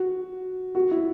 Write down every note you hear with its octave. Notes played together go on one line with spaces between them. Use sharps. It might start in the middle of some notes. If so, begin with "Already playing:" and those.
Already playing: F#4
F#4
E4